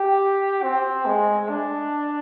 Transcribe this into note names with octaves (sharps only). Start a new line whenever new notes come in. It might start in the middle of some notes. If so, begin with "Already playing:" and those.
Already playing: G4
C4
G#3
D4